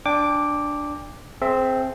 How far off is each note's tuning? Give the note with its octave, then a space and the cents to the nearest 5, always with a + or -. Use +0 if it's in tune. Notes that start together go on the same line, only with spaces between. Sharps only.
D4 +0 G5 +35 D6 +0
C4 -5 G#4 +30 E5 +15